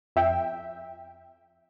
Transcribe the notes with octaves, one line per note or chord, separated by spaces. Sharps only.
F2 E5 G5